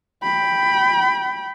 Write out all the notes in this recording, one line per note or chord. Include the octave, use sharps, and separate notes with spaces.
G5 B5